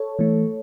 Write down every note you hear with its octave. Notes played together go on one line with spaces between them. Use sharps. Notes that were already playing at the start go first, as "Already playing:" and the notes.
Already playing: A4 C#5
E3 A3